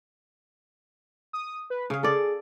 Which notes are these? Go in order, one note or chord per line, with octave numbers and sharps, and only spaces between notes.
D#6
B4
C#3 G#4 F5
A4 D5